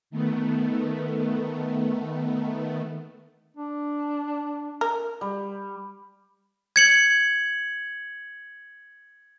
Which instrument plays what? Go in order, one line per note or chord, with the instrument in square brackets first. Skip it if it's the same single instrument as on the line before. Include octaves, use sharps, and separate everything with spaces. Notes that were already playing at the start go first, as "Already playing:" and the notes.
[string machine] D#3 A3 B3
[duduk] D4
[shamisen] A#4
[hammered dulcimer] G3
[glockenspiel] G#6 C#7 F#7